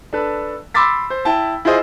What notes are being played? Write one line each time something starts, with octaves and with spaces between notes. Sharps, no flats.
D4 A4 B4
B5 C6 D6 E6 A6 B6
C5
E4 G5 A5
E4 F4 G#4 C5 D#5